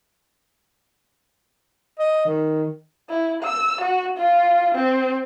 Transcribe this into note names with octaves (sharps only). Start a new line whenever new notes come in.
D#5
D#3
E4
E6
F#4
F4
C4